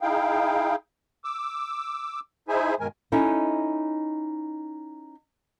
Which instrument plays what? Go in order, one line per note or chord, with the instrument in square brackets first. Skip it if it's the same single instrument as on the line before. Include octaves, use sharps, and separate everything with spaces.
[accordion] D#4 E4 G#4 F5 G5
D6 E6
D#4 E4 G#4 C5 E5 G#5
G2 B2 D#3 G#3 A#4 G#5
[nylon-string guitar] C#4 D#4 E4 A4 D#5